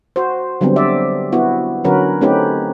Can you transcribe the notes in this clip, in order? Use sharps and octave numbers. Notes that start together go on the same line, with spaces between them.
F#4 C5
D3 F#3 G3 B3 C4
C5 D5 E5
B3 E4 F#4
D3 F#3 C#4 F#4 A#4 B4
A3 C4 C#4 D#4 G4 B4